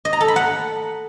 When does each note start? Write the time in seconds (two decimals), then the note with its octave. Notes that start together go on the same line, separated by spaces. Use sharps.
0.05 D#5
0.13 A#5
0.21 A4
0.28 B5
0.36 F#5